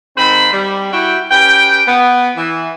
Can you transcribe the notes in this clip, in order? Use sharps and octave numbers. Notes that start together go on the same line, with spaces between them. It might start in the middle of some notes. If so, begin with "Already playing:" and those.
G#2 D#3 C4 C5 B5
G3
E4 F#4 G5
C#4 G4 B4 G5
B3
E3